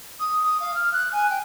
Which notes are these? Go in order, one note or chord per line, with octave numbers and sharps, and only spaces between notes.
D#6
D#6
F5
F6
F#6
G#5
G5